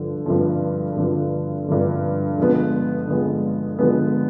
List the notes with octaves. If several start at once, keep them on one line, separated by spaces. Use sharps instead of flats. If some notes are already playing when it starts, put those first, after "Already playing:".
Already playing: G2 D3 F3
G2 D3 F3
G2 D3 F3
G2 D3 F3
D3 F3 G#3 B3
D3 F3 G#3 B3
D3 F3 G#3 B3